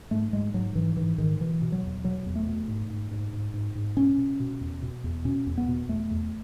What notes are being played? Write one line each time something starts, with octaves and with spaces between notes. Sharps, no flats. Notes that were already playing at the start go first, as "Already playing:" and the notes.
G#2 A3
G#2 G#3
G#2 F#3
G#2 E3
G#2 E3
G#2 D#3
B2 E3
B2
F#3
E2
B2 F#3
E2
A3
B2
G#2
G#2
G#2
G#2
G#2
G#2
B2 C#4
B2
B2
E2
B2
E2
B2 C#4
E2
B3
B2
E2 A3
E2